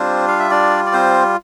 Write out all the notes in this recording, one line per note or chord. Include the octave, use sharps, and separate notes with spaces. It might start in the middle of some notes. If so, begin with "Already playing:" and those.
Already playing: G3 C4 D4 F4 C5
F5
E5
D4 D5
D5
C4 C5